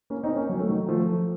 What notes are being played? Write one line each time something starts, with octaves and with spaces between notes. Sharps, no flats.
A#3 C#4
C4 D#4
A#3 C#4
F#3
A3
D#3 F#3
F3 A3